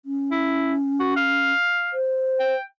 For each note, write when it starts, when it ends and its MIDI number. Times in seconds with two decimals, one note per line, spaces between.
0.05 1.52 61
0.31 0.74 64
1.00 1.11 66
1.17 1.94 77
1.93 2.55 72
2.40 2.63 79